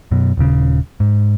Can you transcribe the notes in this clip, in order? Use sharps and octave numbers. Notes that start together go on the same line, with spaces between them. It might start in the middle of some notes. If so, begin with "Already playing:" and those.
F#2 B2
D#1 C#3
G#2